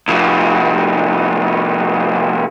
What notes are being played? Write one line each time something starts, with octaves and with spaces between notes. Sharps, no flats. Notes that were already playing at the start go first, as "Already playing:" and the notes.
C2 F3